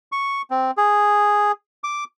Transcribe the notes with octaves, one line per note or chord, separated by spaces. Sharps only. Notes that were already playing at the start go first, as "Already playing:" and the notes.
C#6
C4
G#4
D6